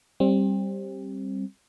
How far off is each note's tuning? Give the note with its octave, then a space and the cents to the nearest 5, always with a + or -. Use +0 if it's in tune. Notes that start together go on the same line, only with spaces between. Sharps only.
G3 +0 C4 +25